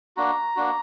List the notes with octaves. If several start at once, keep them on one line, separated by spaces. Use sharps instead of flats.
A#3 D4 F#4 A#5
A#3 D4 F#4